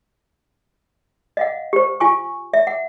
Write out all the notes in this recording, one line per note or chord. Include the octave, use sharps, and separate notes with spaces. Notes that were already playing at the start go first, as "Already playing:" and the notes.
D#5 F5 F#5
G4 C5
F4 G#5 C#6
E5
F#5